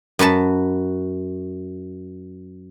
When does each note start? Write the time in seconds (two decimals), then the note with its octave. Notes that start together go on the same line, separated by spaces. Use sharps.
0.19 F#2 F#4 B4 A5